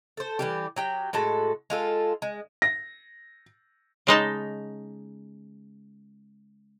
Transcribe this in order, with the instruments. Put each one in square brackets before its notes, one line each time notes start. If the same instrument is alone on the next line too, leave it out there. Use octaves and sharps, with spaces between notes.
[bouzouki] A4 C5
E3 G3 G4
F#3 G4 G5
A2 G#3 F#4 A4
G#3 F4 A4
G#3
[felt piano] A#6
[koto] C#3 G#3 D#4 A5